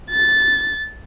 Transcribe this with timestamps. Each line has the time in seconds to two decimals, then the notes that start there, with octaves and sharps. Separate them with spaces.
0.10 A6